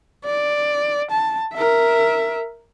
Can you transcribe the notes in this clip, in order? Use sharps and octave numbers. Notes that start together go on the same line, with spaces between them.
D5
A5
A#4 E5